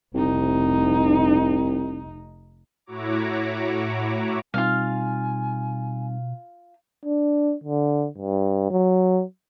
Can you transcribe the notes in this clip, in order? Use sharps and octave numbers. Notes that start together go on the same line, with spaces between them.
F1 C2 D#4
A2 E4 F#4 C#5 A#5 D6
B2 G3 C4 D#4 F4 F5 G#5
D4
D3
G2
F#3